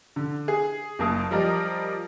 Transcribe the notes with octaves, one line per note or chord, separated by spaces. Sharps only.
D3
G#4
F#1 A#3 A5 D#6
F3 G3 A#4 D5 D#5